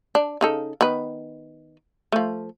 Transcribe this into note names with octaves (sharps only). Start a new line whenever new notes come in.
D4
C#3 D#4 A4
D#3 B3 B4
F3 A3